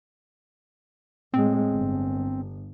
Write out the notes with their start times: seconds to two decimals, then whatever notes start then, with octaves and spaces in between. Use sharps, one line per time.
1.34 A2 G#3 C4
1.73 G1